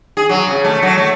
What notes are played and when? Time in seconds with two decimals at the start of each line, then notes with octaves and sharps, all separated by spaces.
0.17 G#4
0.29 F#3
0.47 C#3
0.65 A3
0.83 F#3
0.98 A3